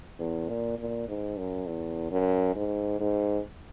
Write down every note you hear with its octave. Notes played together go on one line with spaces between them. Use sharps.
E2
A#2
A#2
G#2
F#2
E2
F#2
G#2
G#2